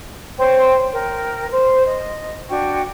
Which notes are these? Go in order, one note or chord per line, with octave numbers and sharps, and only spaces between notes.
C5 C#5 G5 C6
A#4 G5
C5
D#5
D4 F#4 G5 C#6